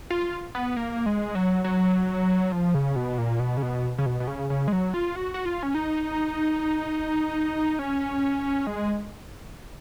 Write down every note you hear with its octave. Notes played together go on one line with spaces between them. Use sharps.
F4
B3
A#3
G#3
F#3
F#3
F3
C#3
B2
A#2
B2
C#3
B2
C#3
B2
B2
C#3
C#3
G#3
F#3
F4
F#4
F#4
F4
C#4
D#4
C#4
G#3